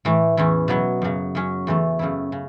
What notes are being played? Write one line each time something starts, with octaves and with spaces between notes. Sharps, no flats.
A2 E3 A3
E2 E3 C#4 E4
B2 F#3 B3 E4
F#2 C#3 F#3
F#2 F#3 C#4
E2 E3 A3
F#2 C#3 A3 E4
C#3